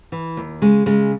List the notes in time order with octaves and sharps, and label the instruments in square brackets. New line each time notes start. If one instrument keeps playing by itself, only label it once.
[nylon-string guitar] E3
D#2
C#3 G#3
C#3 G#3